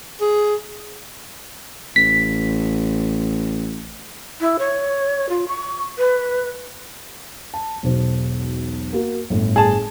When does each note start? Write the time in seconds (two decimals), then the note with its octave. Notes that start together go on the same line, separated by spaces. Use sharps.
0.21 G#4
1.96 A1 B6
4.40 E4
4.59 C#5
5.29 F4
5.48 C#6
5.98 B4
7.54 A5
7.83 E1 B1 C5
8.93 A#3 F#4 A#4
9.30 G1 A2
9.56 G#4 A5